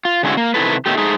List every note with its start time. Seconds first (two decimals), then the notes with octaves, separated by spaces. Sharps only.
0.05 F4
0.23 D3 G#3 A3 C#4 E4 F#4
0.37 A#3
0.54 C3 D#3 G3 E4 A4 B4
0.86 B2 D#3 A3 G4
0.98 G#3 A3 D#4 G#4